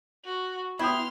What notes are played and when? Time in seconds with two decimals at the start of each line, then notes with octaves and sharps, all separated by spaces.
0.25 F#4
0.79 B3 E4 G5 C6 D#6 F6